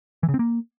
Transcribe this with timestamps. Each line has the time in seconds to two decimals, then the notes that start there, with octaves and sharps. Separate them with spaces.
0.23 E3
0.29 C#3
0.34 C4
0.39 A#3